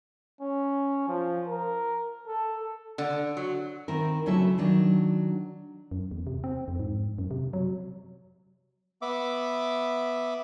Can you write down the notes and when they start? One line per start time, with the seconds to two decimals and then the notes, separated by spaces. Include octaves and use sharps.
0.41 C#4
1.08 F3
1.47 A#4
2.27 A4
2.98 D3
3.37 F#3
3.88 D#3 C4 E4 A#4
4.26 D2 C#3 F#3 E4 A4 E5
4.58 D#3 F#3 D4
5.91 F#2
6.11 E2
6.27 C3
6.44 C4
6.68 F2
6.79 G#2
7.18 F#2
7.31 C3
7.53 F#3
9.02 B3 E5 D6